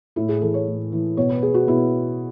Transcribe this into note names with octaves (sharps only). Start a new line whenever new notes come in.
A2 E4
G#4
E3 A4
C#5
A2
E3
B2 C#5
B4
G#4
F#4
B2 E4